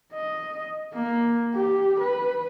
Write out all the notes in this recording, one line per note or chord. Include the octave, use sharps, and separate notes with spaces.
D#5
A#3
G4
B4